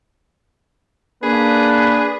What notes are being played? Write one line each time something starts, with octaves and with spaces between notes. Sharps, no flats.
A#3 D4 G#4 B4